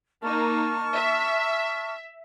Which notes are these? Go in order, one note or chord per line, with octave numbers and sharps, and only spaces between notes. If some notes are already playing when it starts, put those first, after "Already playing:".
A#3 D#4 A5 C#6 F6
E5